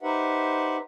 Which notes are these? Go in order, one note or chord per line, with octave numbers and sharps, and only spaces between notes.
D#4 G4 B4 C5 E5 F#5